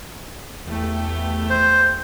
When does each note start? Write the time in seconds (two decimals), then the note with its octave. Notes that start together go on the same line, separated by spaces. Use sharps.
0.64 E2 A3 G4
1.50 C5